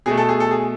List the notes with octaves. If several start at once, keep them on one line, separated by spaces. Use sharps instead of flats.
B2 A3 G#4
A4
G#4
A4
G#4